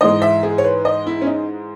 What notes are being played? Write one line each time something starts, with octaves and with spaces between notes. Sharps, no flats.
G#2 E3 G#3 D#5
E5
G#4
C#5
B4
D#5
E4
C#4
D#4